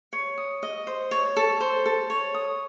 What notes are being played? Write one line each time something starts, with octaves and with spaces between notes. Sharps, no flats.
C#5
D#6
D#5
C5
C#5
A4
C5
A4
C#5
D#6